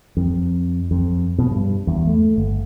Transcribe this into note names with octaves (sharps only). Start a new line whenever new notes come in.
F2
F2
B2
G2
E2
A3
G1